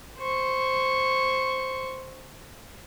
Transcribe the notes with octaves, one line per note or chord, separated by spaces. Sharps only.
C5 C#6